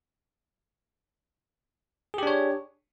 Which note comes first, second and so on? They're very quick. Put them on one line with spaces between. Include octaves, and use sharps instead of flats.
G#4 G4 D4 C#5